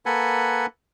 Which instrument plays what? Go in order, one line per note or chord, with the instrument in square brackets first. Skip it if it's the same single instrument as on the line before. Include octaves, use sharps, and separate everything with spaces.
[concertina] A#3 A4 B4 F#5 G#5